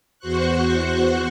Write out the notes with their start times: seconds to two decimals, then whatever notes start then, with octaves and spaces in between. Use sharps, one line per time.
0.19 E2 F#4 C5 C#6 F#6